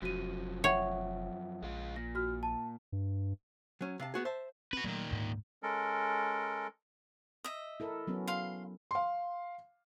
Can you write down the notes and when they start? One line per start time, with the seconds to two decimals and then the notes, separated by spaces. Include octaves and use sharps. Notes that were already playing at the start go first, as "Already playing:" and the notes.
0.02 F1 F#2 F3 F#4 D#7
0.64 C#5 E5 F#5 G5
1.63 A#1 G#3 F4
1.96 A#2 A#6
2.15 F#4 F6
2.43 A5
2.92 G2
3.81 F#3 C#4
4.00 C3 F5 A5
4.14 B3 F#4 G#4
4.25 C5 E5 A5
4.73 C4 F#4 B4
4.84 A#2 D#3 F#3 A3
5.11 D2 G#2
5.63 G#3 C#4 A4 A#4
7.44 D#5 E5
7.80 E4 A4 A#4
8.07 F#3 B3 C#4
8.27 F5 C6
8.91 F5 C6